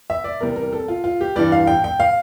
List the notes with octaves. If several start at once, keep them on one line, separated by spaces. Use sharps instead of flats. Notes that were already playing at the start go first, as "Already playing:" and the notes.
E5
D5
E2 C3 G3 A#4
A#4
A4
F4
F4
G4
G2 E3 G3 D5
F5
G5
G5
F5